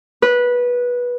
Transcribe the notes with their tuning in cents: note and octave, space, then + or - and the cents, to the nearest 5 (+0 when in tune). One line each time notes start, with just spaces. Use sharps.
B4 -15